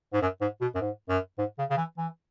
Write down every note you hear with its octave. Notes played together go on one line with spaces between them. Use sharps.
G#2
F#2
G#2
B2
F#2
G#2
F#2
G#2
C#3
C#3
E3
E3